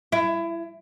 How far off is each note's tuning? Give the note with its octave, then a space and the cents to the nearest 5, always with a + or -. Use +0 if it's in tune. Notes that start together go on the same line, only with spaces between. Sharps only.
E4 +25